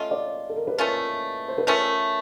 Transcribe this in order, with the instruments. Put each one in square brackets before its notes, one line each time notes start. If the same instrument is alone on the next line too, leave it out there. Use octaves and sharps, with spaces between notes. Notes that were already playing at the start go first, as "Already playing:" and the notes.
Already playing: [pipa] A3 C#4 F4 [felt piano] D#5
[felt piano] D5
A4
A#4
B4
[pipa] A3 C#4 F4 [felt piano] A#4
[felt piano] C5
B4
[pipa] A3 C#4 F4 [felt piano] A#4